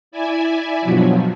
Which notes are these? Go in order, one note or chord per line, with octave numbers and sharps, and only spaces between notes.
E4 D5 E5 G#5
G2 B2 F3 F#3